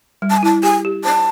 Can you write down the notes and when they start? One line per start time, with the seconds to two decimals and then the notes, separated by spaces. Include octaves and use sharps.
0.22 G3
0.30 A5
0.37 G#5
0.43 E4 A5
0.63 G4 G#5
0.85 G4
1.04 C5 A5